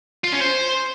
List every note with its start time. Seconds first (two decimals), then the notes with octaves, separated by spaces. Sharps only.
0.24 F4
0.33 C#4
0.41 C5